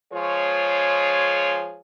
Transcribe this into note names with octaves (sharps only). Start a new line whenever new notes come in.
F3 G#3 F4 G#4 C#5